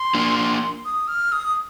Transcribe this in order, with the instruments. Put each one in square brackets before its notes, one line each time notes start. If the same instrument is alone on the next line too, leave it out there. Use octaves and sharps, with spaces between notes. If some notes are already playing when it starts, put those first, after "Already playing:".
Already playing: [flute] C6
[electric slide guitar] A#3 D4
[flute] D#6
F6
D#6